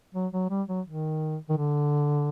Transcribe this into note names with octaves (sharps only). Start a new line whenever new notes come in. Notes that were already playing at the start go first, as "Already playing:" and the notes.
F#3
F#3
G3
F#3
D#3
D#3
D3